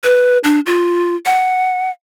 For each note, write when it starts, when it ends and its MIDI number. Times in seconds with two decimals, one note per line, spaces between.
0.04 0.38 71
0.44 0.60 62
0.66 1.16 65
1.26 1.91 78